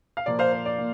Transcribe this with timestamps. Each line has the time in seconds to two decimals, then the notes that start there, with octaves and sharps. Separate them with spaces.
0.17 F5
0.26 A#2 F3 A#3 D5
0.39 C5 F5
0.52 C5
0.65 D5
0.78 A#2 A#3